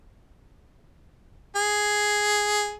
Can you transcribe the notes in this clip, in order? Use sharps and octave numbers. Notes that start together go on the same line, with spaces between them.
G#4